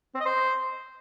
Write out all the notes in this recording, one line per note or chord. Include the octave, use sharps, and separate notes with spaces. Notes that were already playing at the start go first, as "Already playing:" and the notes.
C4
D#5
C5